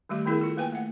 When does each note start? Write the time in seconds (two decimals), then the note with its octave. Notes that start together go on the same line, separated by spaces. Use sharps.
0.09 D#3 G3 A3 G4
0.25 D#3 B3 E4 G#4 A#4
0.41 F4 A4
0.57 A#3 B4 G5 G#5
0.72 A3 F#5